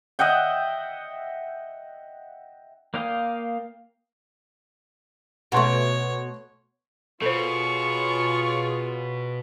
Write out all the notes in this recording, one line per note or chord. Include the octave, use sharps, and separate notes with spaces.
D#5 E5 F#5 G5
A#3 D5 F5 G5 D#6
B2 A3 C#5 F#5 C6 C#6
B2 F4 G#4 A4 C5 C#5 C#6